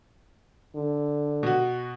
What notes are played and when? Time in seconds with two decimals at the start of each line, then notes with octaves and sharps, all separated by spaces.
0.75 D3
1.43 B2 F#4